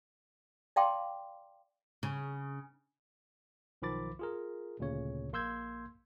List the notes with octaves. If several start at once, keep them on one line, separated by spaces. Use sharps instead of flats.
D5 F5 G5 A5 C6 D6
C#3
B1 D#3 F3 B5 D6 A6
F4 G#4 A#4
D2 A#2 C#3 C#5
A#1 A#3 C6 E6 G6 G#6